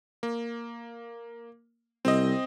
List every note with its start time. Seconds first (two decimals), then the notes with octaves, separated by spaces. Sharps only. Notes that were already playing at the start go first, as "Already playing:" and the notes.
0.23 A#3
2.05 C2 C4 D#5